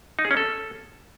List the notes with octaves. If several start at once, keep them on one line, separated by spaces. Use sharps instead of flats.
D#4
G#4
C#4
A4